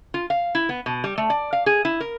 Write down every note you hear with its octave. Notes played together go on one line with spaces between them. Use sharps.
F4
F5
E4
B3
B2
G3
A3
D5
F5
G#4
E4
A#4